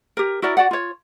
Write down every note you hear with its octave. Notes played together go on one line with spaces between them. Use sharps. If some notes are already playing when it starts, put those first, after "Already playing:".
G4 A#4
E4 F#4 A#4 D5
F#4 D5 F#5
F4 C#5